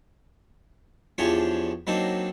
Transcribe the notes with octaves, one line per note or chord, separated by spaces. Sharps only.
E2 F3 D4 G4 G#4 C#5
F#3 A#3 C4 D4 D#4